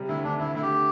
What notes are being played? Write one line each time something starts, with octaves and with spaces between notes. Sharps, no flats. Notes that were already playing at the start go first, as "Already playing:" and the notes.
Already playing: C3 G3
D2 E4
D2 D4
D2 E4
D2 E4
G4